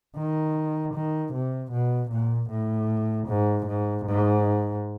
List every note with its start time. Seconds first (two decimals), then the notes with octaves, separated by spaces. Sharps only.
0.16 D#3
0.94 D#3
1.33 C3
1.72 B2
2.11 A#2
2.50 A2
3.28 G#2
3.66 G#2
4.05 G#2